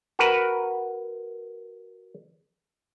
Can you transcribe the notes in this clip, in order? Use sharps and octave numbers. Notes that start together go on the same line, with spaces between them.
F#4 A#4 B4